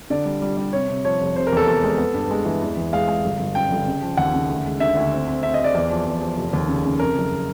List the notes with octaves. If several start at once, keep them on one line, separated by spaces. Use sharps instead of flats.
D3 D5
G3
G3
G3
C3 C#5
C3
F3 C#5
F1
C3 C5
A#4
E2 A4
E2 A4
G#3
B3
G2
G#3
E3
E2
E2
G#3 F5
G#3
G1
G1
F#2 G5
G1
C#3
F3
D#2 F#5
C#3
D2
G#3
D3 E5
D2
C4
C4
C4 E5
C4 D#5
D5
E2
F3
E2
F3
F1
D#2
C#3
C#3
F2 A#4
F#1